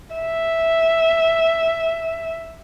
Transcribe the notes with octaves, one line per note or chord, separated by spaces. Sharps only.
E5